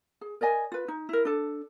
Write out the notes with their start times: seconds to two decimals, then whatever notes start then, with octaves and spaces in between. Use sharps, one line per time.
0.21 G#4
0.41 A#4 D5 D#5 G#5
0.72 F4 B4
0.88 D#4
1.09 E4 A#4
1.25 D4 A4